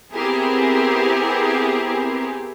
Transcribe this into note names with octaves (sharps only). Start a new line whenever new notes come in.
B3 C4 E4 G4 G#4 A#4